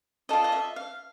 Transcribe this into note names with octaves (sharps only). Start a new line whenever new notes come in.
F4 A4 D5 D#5
D#5
E5
F5